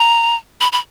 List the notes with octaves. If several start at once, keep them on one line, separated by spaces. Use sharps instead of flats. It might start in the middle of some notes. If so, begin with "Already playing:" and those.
Already playing: A#5
B5
B5